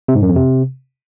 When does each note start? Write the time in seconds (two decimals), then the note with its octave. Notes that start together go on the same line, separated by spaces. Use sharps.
0.08 C3
0.15 G#2
0.22 F#2
0.29 F2
0.36 C3